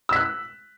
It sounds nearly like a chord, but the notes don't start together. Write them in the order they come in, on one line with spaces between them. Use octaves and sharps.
E6 B6 F#6